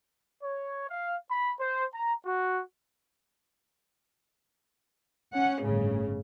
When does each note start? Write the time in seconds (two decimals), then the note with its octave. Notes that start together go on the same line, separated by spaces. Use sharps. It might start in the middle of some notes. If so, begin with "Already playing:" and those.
0.43 C#5
0.90 F5
1.31 B5
1.60 C5
1.94 A#5
2.26 F#4
5.35 C#4 F#5
5.63 G1 A2 C#3